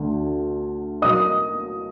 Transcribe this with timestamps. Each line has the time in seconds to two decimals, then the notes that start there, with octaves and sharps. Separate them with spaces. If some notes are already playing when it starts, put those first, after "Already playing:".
Already playing: D2 D3
1.02 F#3 A#3 D#5 D#6